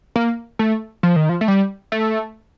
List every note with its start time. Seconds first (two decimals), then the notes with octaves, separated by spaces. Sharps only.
0.16 A#3
0.59 A3
1.03 F3
1.16 D#3
1.29 F3
1.41 A3
1.48 G3
1.92 A3